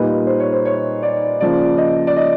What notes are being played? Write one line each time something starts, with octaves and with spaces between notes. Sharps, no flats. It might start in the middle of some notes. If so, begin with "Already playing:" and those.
Already playing: A#2 G3 A#3 D#4 B4
C5
C#5
C5
C#5
D5
C#3 F3 A#3 D5
D#5
D5
D#5